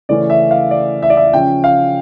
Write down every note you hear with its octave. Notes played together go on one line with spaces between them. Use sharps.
C#3 E3 A3 C#4 D5
E5
F5
D5
E5
D5
E5
C#3 F3 C#4 G5
F5